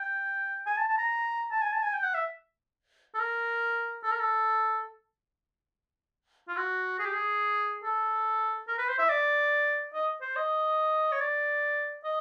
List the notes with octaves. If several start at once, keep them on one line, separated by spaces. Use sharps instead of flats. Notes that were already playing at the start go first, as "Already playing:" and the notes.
Already playing: G5
G#5
A5
A5
A#5
A5
G#5
A5
G#5
G5
F#5
E5
A4
A#4
A4
A#4
A4
F4
F#4
G#4
G4
G#4
A4
A#4
B4
C5
E5
D5
D#5
C5
D#5
C#5
D5
D#5